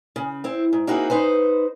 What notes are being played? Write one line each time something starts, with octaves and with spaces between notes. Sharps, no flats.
C#3
C4 E4
G#2
A#3 C4 D#4 E4 F#4 G#4
D#4 B4 C5